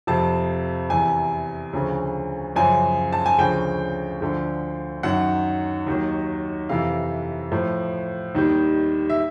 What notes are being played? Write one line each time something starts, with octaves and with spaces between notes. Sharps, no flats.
F2 C3 F3 A5
E2 C3 E3 G#5
D2 C#3 F3
F#2 C#3 F3 G#5
A5
G#5
D2 C#3 F3 G5
D2 D3 F3
F#2 D#3 F#3 F#5
D#2 D#3 F#3
F2 C3 E3 F5
A2 F3
D#2 D#3 G3
E5